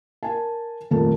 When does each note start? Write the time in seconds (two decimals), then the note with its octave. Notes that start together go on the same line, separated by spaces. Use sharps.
0.23 A#4 G#5 A5
0.91 D#1 F2 A#2 A3 A#4 A5